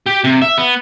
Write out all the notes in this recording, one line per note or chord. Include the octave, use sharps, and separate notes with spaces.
G4
C3
E5
B3